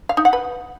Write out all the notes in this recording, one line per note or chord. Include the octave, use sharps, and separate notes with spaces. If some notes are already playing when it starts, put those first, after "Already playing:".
F5
D#4
F#5
B4